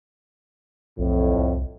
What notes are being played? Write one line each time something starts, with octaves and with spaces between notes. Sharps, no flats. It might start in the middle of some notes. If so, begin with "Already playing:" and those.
B1 F2 A2
C2